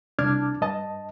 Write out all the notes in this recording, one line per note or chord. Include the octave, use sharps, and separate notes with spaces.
C2 D4 A5 D6 F6 G#6
G2 D#5 A5